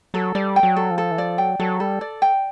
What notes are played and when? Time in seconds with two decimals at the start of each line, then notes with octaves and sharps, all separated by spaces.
0.14 F#3 A4
0.35 G3 D5
0.56 G5
0.63 F#3
0.76 A4
0.91 F3
0.98 A4
1.11 E3
1.17 F3 D5
1.38 F#3 G5
1.60 F#3 A4
1.80 G3 A4
2.01 D5
2.22 G5